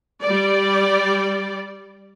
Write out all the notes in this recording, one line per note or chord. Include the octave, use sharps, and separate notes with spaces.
G3 D5